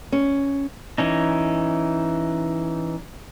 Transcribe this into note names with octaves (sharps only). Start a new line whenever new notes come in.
C#4
E3 C#4 D#4